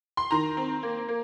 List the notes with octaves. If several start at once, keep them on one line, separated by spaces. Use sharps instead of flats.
C6
D#3 A#5
C4
A#3
A#3